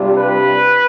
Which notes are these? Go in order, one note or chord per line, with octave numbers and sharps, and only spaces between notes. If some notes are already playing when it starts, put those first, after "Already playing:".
Already playing: C3 G3 D4 F4
B4